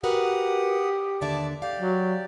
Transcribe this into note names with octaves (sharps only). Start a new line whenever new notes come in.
F#4 G4 A#4 B4 F#5 D#6
D#2 D3 D5 E5 A5 D6
G4 D5 F5
F#3